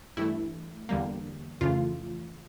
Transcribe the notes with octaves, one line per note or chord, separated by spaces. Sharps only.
G2 E3 A3 E4
E2 D3 G3 A#3
F2 C#3 E3 A3 F4